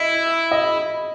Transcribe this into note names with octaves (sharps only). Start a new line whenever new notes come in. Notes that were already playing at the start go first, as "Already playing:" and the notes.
Already playing: E4 D#5
D#5